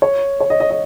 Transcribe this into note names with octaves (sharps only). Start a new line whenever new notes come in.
C#5
C#5
D#5
D#5
D#5